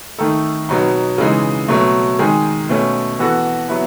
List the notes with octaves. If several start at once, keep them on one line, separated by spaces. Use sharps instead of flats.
D#3 A3 D#4 A4
B2 F#3 B3 D#4
C#3 E3 G#3 D#4
B2 F#3 A3
D#3 G#3 D#4 G#4
B2 A3 C#4
E3 B3 F#4 A4
F#3 B3 E4